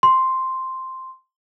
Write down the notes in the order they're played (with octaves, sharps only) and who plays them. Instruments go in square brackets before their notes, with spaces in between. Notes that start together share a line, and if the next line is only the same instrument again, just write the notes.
[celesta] C6